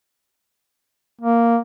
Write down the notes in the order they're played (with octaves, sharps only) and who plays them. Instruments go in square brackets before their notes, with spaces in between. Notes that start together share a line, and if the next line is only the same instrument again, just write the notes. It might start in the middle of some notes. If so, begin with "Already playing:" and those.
[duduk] A#3